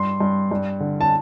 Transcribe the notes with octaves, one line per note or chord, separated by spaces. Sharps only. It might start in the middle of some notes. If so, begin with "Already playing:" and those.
Already playing: G2 C6
G2
G2
D3
A5